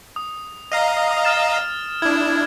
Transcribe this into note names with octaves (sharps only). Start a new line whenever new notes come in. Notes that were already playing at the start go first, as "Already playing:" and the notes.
D#6
D#5 F5 A#5
D#6
F6 A6 E7
D4 E4 G#6